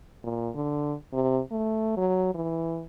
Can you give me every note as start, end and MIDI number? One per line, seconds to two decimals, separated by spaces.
0.24 0.50 46
0.55 0.95 50
1.13 1.41 48
1.51 1.94 57
1.97 2.32 54
2.35 2.85 52